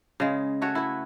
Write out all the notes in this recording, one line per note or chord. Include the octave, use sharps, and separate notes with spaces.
C#3 G#3
A3 F#4 C#5
E4 B4